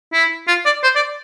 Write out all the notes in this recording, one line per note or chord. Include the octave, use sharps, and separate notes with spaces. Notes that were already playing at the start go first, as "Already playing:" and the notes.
E4
F4
D5
C5
D5